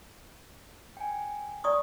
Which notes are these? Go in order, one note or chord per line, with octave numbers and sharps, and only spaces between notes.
G5 G#5
D5 C#6 D#6